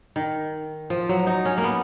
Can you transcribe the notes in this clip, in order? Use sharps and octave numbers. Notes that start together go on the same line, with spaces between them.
D#3
F3
F#3
D#4
C#4
A#3
B3